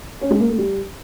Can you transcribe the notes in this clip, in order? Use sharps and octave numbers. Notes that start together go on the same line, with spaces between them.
C#4
G#3
A#3
A3
G3